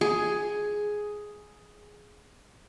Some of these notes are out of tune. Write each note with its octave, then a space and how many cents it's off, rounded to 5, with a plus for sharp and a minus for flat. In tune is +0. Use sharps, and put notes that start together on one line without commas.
G#4 +5